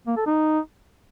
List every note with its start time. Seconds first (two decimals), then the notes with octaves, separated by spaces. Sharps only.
0.07 A#3
0.17 A4
0.26 D#4